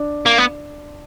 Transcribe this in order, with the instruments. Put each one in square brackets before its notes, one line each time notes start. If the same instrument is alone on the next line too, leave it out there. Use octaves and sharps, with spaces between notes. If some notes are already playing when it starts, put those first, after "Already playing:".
Already playing: [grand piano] D4
[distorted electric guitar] A#3
B3